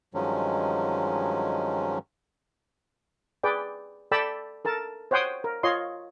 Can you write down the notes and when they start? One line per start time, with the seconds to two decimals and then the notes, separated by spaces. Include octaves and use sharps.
0.14 G2 D#3 F3 F#3 G#3 C#4
3.43 G#4 B4 D5 G5
4.11 A4 D5 G5 A5 B5 E6
4.65 A4 A#4 A5
5.11 C5 C#5 F#5 G5 C6 D#6
5.44 A#4
5.63 F4 C#5 D#5 C6